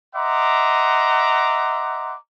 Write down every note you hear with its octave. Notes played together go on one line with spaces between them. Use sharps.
D#5 E5 F#5 A#5 C6 D6